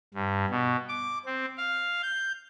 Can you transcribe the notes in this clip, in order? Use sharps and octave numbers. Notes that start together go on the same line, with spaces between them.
G2
B2
D6
C4
F5
G6